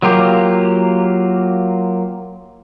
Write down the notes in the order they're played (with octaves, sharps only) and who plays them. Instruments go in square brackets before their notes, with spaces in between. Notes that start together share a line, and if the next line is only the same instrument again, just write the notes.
[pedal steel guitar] F#3 A#3 F4 G4